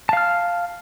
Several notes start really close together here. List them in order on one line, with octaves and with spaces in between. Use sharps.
A5 F5 F6